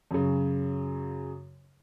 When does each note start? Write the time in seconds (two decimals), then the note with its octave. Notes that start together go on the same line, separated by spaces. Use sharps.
0.11 F#2 C#3